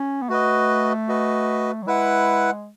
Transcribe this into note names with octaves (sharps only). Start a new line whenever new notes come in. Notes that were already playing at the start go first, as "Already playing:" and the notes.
Already playing: C#4
B3
A3 F#4 B4 D#5
F#4 B4 D#5
F#3
G#3 E4 B4 F#5